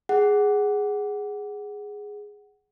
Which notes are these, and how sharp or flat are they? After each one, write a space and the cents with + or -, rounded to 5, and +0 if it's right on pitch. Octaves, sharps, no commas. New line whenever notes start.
G#4 +0 F#5 +10